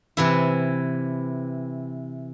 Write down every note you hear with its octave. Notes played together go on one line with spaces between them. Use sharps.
C3 E3 E4